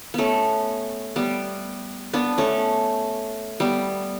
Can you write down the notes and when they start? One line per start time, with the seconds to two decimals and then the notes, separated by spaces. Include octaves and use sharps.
0.14 A3 B3 C#4
1.16 G3 B3
2.13 B3 D4
2.38 A3 C#4
3.60 G3 B3